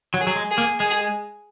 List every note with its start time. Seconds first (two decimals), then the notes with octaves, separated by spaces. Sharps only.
0.14 F#3
0.21 G#4
0.27 F#3
0.36 G#3
0.51 G#4
0.58 A#3
0.80 G#3 G#4